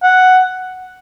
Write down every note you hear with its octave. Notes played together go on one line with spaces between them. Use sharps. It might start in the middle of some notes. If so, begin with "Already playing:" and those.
F#5